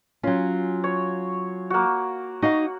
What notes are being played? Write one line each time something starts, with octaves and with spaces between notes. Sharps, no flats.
F#3 C#4 F4 G#5
C#5
A#3 F#4
D#4 F#4 D#5 F5